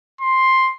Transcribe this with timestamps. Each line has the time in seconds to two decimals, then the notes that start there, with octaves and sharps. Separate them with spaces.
0.21 C6